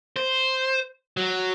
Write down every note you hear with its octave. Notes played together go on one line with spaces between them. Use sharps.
C5
F#3